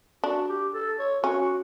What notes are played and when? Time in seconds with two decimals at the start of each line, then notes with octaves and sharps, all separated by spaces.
0.24 D4 F#4
0.49 G4
0.74 A4
0.99 C#5
1.23 C#4 F#4
1.41 F#4